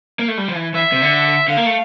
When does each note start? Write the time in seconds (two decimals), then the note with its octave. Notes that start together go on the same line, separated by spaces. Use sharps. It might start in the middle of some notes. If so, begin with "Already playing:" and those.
0.19 A#3
0.28 A3
0.38 G3
0.48 F3
0.55 E3
0.74 E3 E5
0.92 C3
1.02 D3
1.48 D3 F5
1.57 A#3
1.66 A3